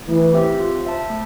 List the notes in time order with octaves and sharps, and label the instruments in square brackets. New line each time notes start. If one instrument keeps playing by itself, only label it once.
[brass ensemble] E3 [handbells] A3
[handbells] C4 G4 C5 E5
F4
C5 E5 A5
A3